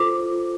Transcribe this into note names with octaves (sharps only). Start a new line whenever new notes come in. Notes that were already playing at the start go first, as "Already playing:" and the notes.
Already playing: F4 A4 C5 D6